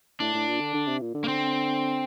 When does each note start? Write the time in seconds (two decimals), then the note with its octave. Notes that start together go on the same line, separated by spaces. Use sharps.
0.20 A2 D4
0.34 A2
0.48 A#2
0.60 D3
0.74 D3
0.88 C3
1.01 A#2
1.14 D3
1.24 A#3
1.28 C4